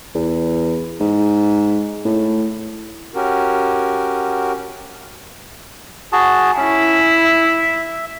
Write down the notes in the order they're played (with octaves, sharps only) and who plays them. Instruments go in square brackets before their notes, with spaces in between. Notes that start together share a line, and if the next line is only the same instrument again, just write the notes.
[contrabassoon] E2
G#2
A2
[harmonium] C#4 F#4 G4 A#4
[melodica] F#4 G#4 A5
[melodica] C#4 [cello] E4
[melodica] E5